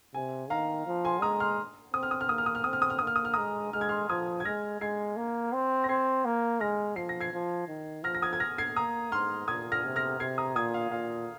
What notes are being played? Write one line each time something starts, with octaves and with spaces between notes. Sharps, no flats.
C3 G#5
D#3 F5 A#5
F3
G#5 C6
G#3 A#5 D#6
C6 F6
C4 D#6
F6
D#6
F6
A#3 D#6
F6
D#6
F6
C4 D#6
F6
D#6
F6
A#3 D#6
F6
D#6
F6
G#3 A#5 D#6
G#3 F6
G#6
C6 F6
F3 D#6 G#6
G#6
G#3 F6 A#6
G#3 G#6 C7
A#3
C4
A#6
C4 G#6 C7
A#3
G#3 F6 A#6
F3 C7
A#6
G#6 C7
F3
D#3
F3 F6 A#6
A#6
D#6 G#6
G#6
F6 A#6
G#6 C7
A#3 A#5 D#6
G#2 C6 F6
A#2 D#6 G#6
F6 A#6
C3
F6 A#6
C3 G#6 C7
A#5 D#6
A#2 D#6 G#6
F5
A#2 F5